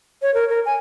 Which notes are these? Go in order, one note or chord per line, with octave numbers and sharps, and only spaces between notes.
C#5
A#4
A#4
G#5